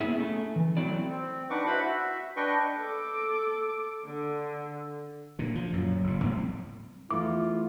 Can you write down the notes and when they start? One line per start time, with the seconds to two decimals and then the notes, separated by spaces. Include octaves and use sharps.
0.01 A#3 B3 E4 G#4 E5
0.16 A3 C#4
0.56 E3
0.77 F#3 A3 C4 E4 D5
1.09 C4
1.50 D4 D#4 B4 F#5 C#6 D6
1.66 E4 F#4 B4 C5 F#5 B5
1.82 F#4 E5
2.36 D4 B4 D#5 G5 C#6
2.77 A4 D6
4.06 D3
5.39 A#2 D3
5.55 F3
5.73 F#2 A#2
6.03 F#1 A2
6.22 F2 A2 G3 C4
7.11 E2 A3 E4 F4 D6